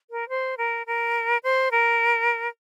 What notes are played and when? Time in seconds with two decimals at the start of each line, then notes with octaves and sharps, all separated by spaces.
0.10 A#4
0.29 C5
0.58 A#4
0.87 A#4
1.43 C5
1.71 A#4